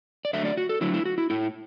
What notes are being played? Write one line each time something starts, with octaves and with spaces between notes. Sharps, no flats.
D5
D3 F#3 A3 E5
D5
F#4
A4
D3 F#3 A3 E4
E4
F#4
E4
A2 A3 E4